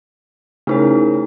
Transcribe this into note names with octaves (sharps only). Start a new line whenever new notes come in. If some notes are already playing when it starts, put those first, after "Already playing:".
C#3 A3 D#4 E4 A#4 C#5